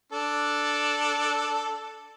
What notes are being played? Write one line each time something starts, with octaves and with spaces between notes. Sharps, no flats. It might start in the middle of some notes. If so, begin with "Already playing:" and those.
D4 A4